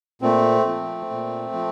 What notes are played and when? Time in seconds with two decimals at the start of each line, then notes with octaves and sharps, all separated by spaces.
0.22 A#2 A3 C4
0.66 F3
1.11 A#2
1.54 F3